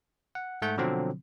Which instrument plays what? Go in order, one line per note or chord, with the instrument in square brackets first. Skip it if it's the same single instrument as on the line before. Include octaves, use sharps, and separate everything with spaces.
[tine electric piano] F#5
G#2 A3 F#5 G6
B2 D3 F3 F#3 C4